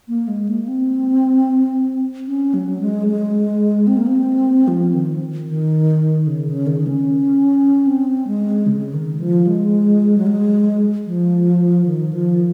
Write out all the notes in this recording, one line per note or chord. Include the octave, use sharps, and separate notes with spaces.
A#3
G#3
A#3
C4
C#4
F#3
G#3
G#3
C4
A#3
C4
F3
D#3
D#3
C#3
C#3
D#3
C#4
C4
G#3
C#3
D#3
F3
G#3
F#3
G#3
F3
D#3
F3